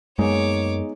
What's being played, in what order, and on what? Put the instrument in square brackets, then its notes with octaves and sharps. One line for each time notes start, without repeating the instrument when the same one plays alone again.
[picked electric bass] F#2 A#3 [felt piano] G#3 [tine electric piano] B3 D#4 G#4 [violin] C#5 D6